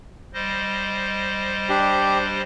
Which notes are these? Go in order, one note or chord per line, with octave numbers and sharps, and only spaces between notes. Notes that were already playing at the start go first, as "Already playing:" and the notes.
G3 C5 D#5
D4 G4